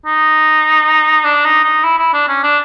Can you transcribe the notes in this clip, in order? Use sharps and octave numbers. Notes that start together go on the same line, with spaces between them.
D#4
D4
D#4
D#4
E4
E4
D4
C#4
D4